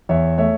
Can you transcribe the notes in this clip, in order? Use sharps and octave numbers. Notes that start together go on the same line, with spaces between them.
E2 C#5 E5
A3 C#5 E5